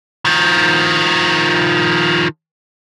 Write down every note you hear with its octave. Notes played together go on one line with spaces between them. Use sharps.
D#3 F3